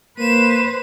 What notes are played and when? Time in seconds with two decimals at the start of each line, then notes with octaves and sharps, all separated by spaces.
0.19 A#3 B4 C5 D#7 E7